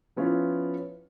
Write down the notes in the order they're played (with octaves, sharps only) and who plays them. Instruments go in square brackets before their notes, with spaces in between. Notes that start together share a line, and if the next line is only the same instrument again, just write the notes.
[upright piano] F3 B3 C#4 E4 F4